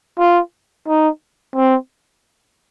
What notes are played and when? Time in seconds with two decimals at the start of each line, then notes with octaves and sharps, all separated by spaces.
0.19 F4
0.88 D#4
1.55 C4